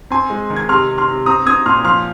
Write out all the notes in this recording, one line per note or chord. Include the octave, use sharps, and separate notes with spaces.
C4 G#5 C6
G#3
D#3
G#6
C3 C6 F6
C3
C6 F6
C3
C4 A#5 D#6
C4 D#6 G#6
A#2 C6 F6
F3 C6 F6